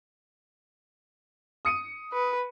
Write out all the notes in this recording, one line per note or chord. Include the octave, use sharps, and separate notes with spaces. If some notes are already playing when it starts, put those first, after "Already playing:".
D#6 C#7 D#7
B4